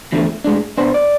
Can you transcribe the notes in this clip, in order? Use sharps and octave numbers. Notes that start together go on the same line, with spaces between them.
E2 D3 F3 A3
A2 G#3 D4
B2 B3 D4 C5
D5